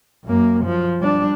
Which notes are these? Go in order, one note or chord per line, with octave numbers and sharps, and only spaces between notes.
F#2 A#3
F3
G3 D4